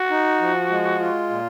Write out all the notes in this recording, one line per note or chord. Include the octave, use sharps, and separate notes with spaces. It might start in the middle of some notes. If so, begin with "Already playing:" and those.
Already playing: F#4
D#4
F3
G#3
F4
A#2